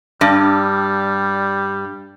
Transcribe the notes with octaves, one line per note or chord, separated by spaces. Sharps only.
G2 G3